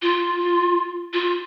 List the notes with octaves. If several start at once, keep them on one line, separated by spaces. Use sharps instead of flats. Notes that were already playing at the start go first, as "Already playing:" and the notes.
F4
F4